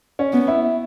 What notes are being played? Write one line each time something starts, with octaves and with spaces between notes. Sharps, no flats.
C#4
B3
E4